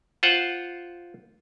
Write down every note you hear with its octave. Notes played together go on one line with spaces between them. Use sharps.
F4 C5 F#5